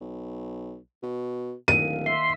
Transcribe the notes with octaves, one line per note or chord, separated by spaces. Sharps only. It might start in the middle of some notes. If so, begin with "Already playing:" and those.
B1
B2
D1 D#3 A#3 D#7
E5 C6